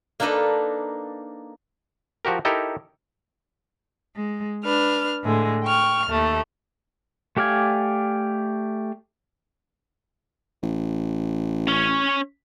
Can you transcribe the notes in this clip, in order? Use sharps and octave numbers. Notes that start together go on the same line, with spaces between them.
A#3 D4 D#4 A4 B4 A#5
F3 F#4 G4 A#4
D#4 E4 G4 A4 A#4
G#3
D4 B4 F6
A2 D3 G#3
G5 C#6 F6
D#2 A3
A3 G4 D5 F5 G#5
A1
C#4 C#5